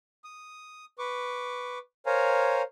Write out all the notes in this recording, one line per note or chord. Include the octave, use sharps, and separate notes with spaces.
D#6
B4 C#6 D6
A#4 C5 C#5 F5 G#5 A#5